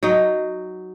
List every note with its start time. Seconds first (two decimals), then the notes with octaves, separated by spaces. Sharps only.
0.03 F#3 D#4